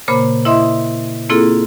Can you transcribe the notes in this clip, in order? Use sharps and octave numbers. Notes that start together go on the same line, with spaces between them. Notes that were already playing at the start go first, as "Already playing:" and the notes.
A#2 C#3 A#3 C5 B5
E4 D#5 E5 C6 D#6
A#3 C4 E4 F4 G#4 A4